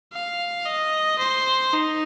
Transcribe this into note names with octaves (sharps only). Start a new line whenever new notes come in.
F5
D#5
C5
D#4